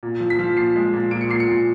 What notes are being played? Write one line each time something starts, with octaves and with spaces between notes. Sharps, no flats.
A#2
F3
B6
F3
A#2 C7
G#3
A#2
A#2 D7
C#7
A#2 C7
C#7
A#2